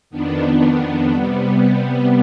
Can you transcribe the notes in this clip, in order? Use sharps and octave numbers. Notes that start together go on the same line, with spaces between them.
F2 D#3 B3 D4
C3 G3 B3